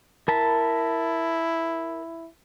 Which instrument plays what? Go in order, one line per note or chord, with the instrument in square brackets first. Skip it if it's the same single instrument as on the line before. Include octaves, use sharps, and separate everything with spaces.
[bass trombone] E4 [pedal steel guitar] A#4 A5 B5